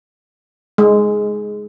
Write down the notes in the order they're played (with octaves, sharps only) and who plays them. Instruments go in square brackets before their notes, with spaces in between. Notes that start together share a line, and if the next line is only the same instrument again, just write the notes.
[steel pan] G#3